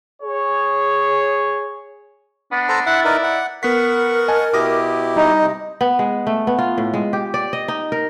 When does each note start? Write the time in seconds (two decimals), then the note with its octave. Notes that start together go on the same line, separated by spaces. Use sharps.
0.22 G#4 C#5
2.52 B3 D4
2.69 A4 C5 A#5
2.86 E4 F#5
3.05 D#4 A#4 B4 D5
3.23 F#5
3.63 B3 A#4 F#5 C#6 B6
4.28 D#5 G#5 A5
4.54 B2 E4 G4 D6 D#6 A#6
5.16 G3 D#4 D#5
5.41 C3
5.81 B3
5.99 G#3
6.27 A3
6.47 B3
6.59 F4
6.78 A2
6.94 G#3
7.13 G4
7.34 D5
7.53 D#5
7.68 D#4
7.92 A#4